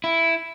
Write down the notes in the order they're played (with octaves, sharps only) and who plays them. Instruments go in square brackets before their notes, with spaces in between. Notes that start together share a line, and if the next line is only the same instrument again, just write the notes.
[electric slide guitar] E4